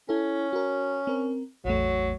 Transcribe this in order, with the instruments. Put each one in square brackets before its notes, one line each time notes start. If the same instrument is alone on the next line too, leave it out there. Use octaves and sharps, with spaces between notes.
[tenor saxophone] C#4 [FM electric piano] E4 A4
[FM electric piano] F#4 A#4
C4 A#4
[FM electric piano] A1 E2 A3 [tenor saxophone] F#3